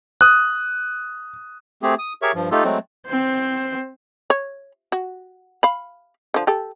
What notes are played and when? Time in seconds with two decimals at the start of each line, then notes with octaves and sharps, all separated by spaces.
0.21 D#6 F#6
1.83 A3 C4 G4 G#4
1.99 D#6
2.22 G4 G#4 A#4 C#5 E5 C#6
2.35 G2 F3
2.52 A3 D#4 F4 G4 A4
2.64 F#3 G#3 A3 C4
3.07 C4 C5
4.30 C#5
4.92 F#4
5.63 F5 B5
6.34 D3 F3
6.47 G4 A4